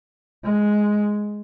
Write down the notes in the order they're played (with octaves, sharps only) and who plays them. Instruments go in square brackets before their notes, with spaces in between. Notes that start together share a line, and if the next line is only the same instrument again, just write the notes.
[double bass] G#3